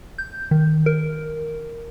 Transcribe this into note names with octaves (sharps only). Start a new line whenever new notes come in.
G6
D#3
A#4